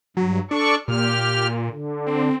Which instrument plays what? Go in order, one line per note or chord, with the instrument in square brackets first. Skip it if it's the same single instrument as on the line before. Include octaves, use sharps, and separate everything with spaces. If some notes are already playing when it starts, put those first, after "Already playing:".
[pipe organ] G2 [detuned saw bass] F#3
[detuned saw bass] D4 [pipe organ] A4 D5 C#6
[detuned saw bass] A#2 [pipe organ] G4 F6
[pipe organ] D3
[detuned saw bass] C4